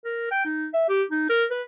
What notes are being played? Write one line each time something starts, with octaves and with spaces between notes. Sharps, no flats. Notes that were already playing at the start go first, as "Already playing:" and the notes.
A#4
G5
D#4
E5
G4
D#4
A#4
B4